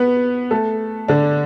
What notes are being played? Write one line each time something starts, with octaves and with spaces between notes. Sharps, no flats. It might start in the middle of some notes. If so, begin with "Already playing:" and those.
Already playing: B3 B4
A3 A4
D3 D4